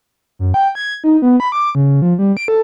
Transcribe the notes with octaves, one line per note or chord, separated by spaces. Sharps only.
F#2
G5
G#6
D#4
B3
B5
D6
C#3
F3
G3
D7
A4